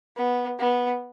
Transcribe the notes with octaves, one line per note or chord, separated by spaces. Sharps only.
B3
B3